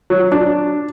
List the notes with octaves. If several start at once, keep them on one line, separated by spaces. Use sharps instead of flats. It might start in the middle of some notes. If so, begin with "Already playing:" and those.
F#3
D4